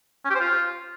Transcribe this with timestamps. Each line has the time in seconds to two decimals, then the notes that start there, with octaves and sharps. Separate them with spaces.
0.25 C#4
0.30 G4
0.35 C5
0.40 F4